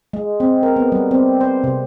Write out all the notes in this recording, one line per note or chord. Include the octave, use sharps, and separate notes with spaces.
G#3
C4
A#4
B3
G3
C4
C5
C3